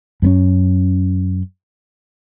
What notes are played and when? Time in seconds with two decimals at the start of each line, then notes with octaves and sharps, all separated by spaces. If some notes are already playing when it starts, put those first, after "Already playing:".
0.22 F#2 B3 C#4